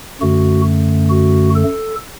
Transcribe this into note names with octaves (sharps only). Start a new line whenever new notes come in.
F#2 D3 A3 F#4
F#4
A4